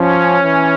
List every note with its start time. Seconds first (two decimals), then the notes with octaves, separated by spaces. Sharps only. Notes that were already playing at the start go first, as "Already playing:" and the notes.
Already playing: F3 C#4
0.44 E3